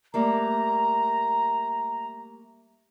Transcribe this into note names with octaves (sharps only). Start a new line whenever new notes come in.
G3 A3 A#3 A#5